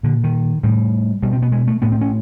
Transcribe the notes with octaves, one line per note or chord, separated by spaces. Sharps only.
A#2 D3
D#3
A2 G3
B2 G3
C4
B3
G#3
A3
A2 B3
C4
C#4